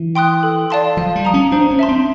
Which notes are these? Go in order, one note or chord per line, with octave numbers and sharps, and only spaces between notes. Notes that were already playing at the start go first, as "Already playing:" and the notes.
Already playing: E3
G5 C6 D#6 F#6
A4
D5 F5 A5 C6
F3 F5
G3
A#5 D#6
C#4
D4 C5
C#4
E5 A5 C6
C4